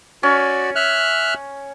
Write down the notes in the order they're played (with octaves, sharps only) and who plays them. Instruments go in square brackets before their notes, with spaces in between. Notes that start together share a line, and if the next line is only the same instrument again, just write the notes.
[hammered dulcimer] C#4 [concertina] F#4 D5
[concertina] E5 F6 F#6